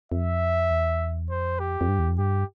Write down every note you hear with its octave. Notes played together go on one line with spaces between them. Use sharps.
F2 E5
E2
F2 C5
G4
F2
G2
E2
F2
G2 G4